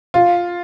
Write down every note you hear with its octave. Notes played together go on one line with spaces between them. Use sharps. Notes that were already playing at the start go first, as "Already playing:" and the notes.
F4